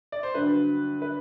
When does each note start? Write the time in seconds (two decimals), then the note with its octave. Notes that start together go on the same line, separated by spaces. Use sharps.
0.12 D5
0.23 C5
0.34 G2 D3 F#3 B4
1.02 B4